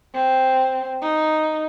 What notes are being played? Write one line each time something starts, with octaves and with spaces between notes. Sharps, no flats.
C4
D#4